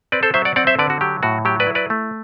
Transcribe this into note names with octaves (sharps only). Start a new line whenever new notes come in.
C4 B4 D5
A4 C5
F#3 C5 E5
D5 F#5
C4 D5 F#5
C5 E5
D3 B4 D5
F#4
F#3 G4
A2 F#4
F#3 G4
B4 D5
E4
B4 D5
A3